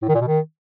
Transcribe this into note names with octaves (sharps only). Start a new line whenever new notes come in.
A2
D#3
A#2
B2
D#3